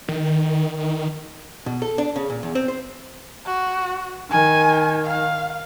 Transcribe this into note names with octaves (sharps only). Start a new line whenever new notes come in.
D#3
B2
A4
D4
C#3
A#2
E2
C4
C5
F#4
D#3 G#5
F5